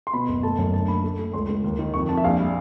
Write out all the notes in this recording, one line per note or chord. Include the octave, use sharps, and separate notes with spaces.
C6
B2 B5
F#1
A3 A5
F#2
D2 A5
A#3 B5
A3
A3
C#2 C6
C#2
D#2
D#3
F2 C#6
F2 A5
E5
A#1 F5
G3